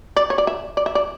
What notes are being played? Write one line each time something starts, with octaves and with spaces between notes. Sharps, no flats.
D5
C#5
D5
E5
D5
E5
D5